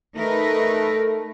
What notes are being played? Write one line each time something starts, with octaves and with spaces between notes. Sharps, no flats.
A3 D#4 A#4 B4